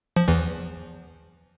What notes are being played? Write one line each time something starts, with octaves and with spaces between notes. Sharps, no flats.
F3
E2 E3